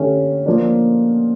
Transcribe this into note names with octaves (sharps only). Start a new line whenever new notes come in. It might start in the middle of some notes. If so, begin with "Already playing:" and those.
Already playing: D3 A3 C#4 G4
F3 A#3 D4